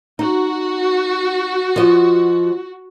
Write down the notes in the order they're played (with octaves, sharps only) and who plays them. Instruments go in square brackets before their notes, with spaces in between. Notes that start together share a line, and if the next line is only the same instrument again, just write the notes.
[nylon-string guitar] D#4 [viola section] F#4
[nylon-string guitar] F3 D#5